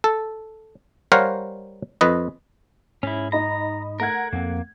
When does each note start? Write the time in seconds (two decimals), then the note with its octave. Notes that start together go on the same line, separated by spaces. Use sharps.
0.04 A4
1.12 G3 A#4 C5 C#5 F5 F#5
2.01 F2 B4 D#5
3.03 G#2 C#4 E4
3.32 D#4 D#5 A#5 B5
4.00 A3 A#4 F#5 G#6
4.33 F2 A#3 C4